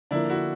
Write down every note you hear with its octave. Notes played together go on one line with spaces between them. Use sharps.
D3 F3 A#3 D4 E4
E4 F#4